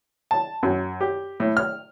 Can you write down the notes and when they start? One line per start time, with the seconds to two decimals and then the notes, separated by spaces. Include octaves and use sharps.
0.31 A5
0.63 F#2
1.01 G4
1.40 A2
1.57 F6